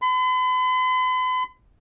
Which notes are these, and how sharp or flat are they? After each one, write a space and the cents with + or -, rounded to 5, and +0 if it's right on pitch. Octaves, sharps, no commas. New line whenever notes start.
B5 +45